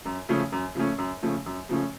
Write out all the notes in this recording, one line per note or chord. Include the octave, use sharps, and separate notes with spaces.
F#2
C#3 F3 A3 C#4
F#2
C#3 F3 A3 C#4
F#2
C#3 F3 A3 C#4
F#2
C#3 F3 A3 C#4